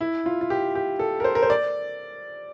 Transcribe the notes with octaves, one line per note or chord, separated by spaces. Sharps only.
E4
F4
F4
G4
G4
A4
A#4
C5
A#4
C5
D5